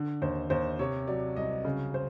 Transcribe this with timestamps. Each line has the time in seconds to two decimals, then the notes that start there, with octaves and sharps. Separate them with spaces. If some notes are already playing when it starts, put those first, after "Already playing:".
Already playing: D3
0.22 D#2 C5
0.50 D#2 C5
0.79 C3 C#5
1.07 F#3 D5
1.36 C2 D#5
1.65 C#3
1.94 C5